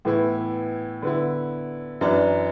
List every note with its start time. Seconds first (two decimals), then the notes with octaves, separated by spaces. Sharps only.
0.05 A2 E3 B3 E4
1.02 D3 B3 E4
2.01 F#2 E3 D4